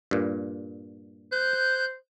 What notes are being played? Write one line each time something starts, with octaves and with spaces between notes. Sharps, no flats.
G2 A#2
C5 F#6 G6